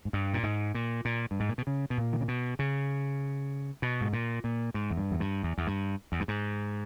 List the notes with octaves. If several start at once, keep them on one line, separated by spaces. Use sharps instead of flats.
G#2
G2
A#2
G#2
A#2
A#2
G2
G#2
A#2
B2
C#3
B2
A#2
D#3
C#3
B2
C#3
B2
G#2
A#2
A#2
G#2
E2
G2
E2
G2
E2
E2
G2
E2
G2
G#2